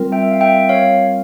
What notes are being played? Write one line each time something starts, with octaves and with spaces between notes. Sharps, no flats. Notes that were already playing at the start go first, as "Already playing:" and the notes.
Already playing: G3 C4 F4 A#4
E5 G5
E5
F5
E5 G5
C#5 F5